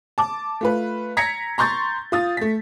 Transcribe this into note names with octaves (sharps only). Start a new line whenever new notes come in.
A5 D6
A3 F4 B4
A#5 G#6 A#6 B6 C#7
A#5 C6 C#6 G6 A6
F4 D#6 A6
A3 B6